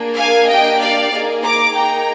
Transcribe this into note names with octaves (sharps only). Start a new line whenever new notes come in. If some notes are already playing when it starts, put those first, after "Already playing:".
Already playing: A#3 D4 G#4
F5 G#5
A#3 D4 G4 D#5 G5
D5 F5
A#3 D#4 G#4
A#5 D6
A#3 D#4 G#4 G5 A#5